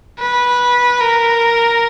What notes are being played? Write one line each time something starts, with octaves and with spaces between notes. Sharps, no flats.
B4
A#4